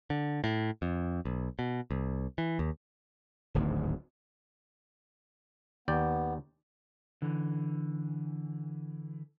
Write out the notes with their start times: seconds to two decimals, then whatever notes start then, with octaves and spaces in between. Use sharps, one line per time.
0.10 D3
0.44 A2
0.82 F2
1.25 B1
1.59 B2
1.91 C2
2.38 E3
2.59 D#2
3.54 D1 G#1 D2 G#2
5.88 D#2 B3 D5 G5
7.22 D3 E3